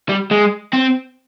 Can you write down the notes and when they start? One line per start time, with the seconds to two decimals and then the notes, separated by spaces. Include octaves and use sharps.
0.09 G3
0.31 G#3
0.73 C4